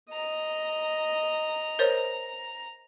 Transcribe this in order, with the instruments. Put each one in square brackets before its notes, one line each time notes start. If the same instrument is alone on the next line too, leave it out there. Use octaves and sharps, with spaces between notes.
[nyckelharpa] D#5 [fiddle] A#5
[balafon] A#4 C5 C#5